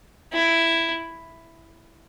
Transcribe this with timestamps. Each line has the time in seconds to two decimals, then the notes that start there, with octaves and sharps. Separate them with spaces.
0.33 E4